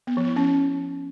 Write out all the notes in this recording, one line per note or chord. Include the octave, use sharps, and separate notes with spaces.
B3
F3
E4
C#4